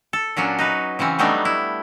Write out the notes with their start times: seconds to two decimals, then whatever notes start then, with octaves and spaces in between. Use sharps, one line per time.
0.13 A4
0.37 A#2 F#3 C#4 D4
0.59 D#4 F#4 B4
0.99 C#3 E3 C4 C#4
1.19 F#3 G3 A3 B3 D4 D#4
1.45 E4